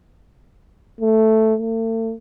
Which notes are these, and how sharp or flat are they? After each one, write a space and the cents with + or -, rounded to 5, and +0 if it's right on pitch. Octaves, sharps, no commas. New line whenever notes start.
A3 +0
A3 +40